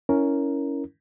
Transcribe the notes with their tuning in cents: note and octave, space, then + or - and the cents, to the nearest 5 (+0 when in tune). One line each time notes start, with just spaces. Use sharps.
C#4 +10 E4 -15 A#4 +0